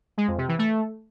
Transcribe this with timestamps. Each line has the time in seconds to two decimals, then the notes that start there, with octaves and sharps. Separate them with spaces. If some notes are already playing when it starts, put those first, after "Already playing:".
0.18 G#3
0.28 F2
0.38 C3
0.48 E3
0.59 A3